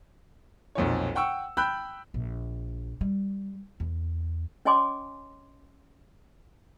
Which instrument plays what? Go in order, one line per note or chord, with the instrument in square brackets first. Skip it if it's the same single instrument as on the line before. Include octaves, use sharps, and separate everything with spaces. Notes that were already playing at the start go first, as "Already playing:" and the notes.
[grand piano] B1 F2 A#2 C#5
F#5 G5 C#6 E6
G5 B5 E6 F#6 G6
[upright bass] A#1
G3
E2
[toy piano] C#4 C#5 D#5 G#5 C6 D6